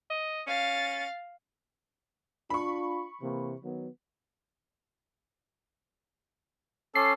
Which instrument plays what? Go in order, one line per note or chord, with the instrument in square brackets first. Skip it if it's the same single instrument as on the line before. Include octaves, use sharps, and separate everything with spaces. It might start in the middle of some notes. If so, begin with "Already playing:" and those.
[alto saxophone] D#5
[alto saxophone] C#4 [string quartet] F5 A6
[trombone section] D4 F4 [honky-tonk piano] B5 C#6
[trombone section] C3 E3 A#3
D#3 F#3 B3
[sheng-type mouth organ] C#4 [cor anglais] A4 [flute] D6 [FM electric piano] C7